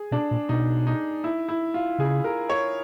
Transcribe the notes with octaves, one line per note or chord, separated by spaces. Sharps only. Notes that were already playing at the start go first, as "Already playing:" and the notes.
Already playing: G#4
B2 D4
A#2
B2 D#4
D#4
E4
E4
F4
C#3 G#4
A#4
C#5